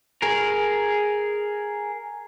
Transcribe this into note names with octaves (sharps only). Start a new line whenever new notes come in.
G#4 A#4